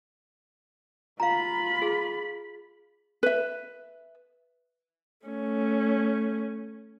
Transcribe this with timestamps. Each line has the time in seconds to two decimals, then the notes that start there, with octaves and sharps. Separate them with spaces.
1.20 F4 F5 A#5 B5
1.82 G#4
3.23 B4 E5
5.26 A3 C#4